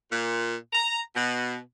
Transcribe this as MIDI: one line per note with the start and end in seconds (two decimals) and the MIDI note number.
0.11 0.55 46
0.73 0.99 82
1.16 1.57 47